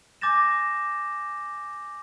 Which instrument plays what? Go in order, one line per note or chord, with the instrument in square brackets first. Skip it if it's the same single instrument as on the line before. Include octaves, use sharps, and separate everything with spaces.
[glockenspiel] G#5 D6 G6 A6 A#6 E7